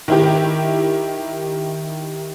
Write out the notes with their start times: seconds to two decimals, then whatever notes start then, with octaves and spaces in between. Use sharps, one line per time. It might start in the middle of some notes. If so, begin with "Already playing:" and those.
0.08 D#3 E4 G4